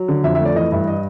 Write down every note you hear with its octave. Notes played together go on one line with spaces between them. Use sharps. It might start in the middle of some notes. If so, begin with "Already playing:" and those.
Already playing: F#3
D3
F2 E5
E5
A3
D5
E3 D#5
G2 E5
D#5